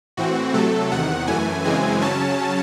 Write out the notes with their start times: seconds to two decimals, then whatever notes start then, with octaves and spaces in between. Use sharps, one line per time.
0.17 A2 E3 C4 F#4
0.54 C3 F#3 A3 A4
0.91 E2 C3 D#3 F#5
1.27 F#2 E3 A3 G#5
1.64 F#2 C#3 E3 G#3 C4 G#5
2.02 C#3 F#3 C#4 A5